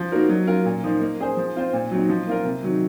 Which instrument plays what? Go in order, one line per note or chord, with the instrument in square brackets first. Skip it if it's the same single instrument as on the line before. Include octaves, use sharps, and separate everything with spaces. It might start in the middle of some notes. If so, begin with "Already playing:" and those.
Already playing: [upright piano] F3
A#3 D#4 F#4 A#4
F#3
C#4 F4 A#4
A#2
F3 A#3 D#4
A#3
C#4 G#4 C5
F3
C4 F4 C5
A#2
F#3 C4 D#4
F3
A#3 F4 A#4
C3
D#3 F#3